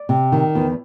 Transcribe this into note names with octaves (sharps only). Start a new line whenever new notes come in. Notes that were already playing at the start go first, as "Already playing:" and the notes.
Already playing: D5
C3
D#3
E2